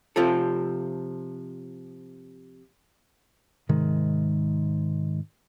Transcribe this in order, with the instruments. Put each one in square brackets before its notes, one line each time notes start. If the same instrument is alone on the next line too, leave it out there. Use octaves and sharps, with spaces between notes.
[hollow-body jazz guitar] C3 F3 F4 A4
[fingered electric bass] G#2 C3 D#3 G#3